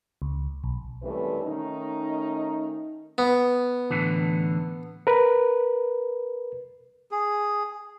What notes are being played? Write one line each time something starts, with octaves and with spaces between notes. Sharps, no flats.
C#2
B1
F#2 C3 E3 G3 A3 B4
D#3 A3 C#4 D#4
B3
A2 D3 E3
A#4 B4
G#4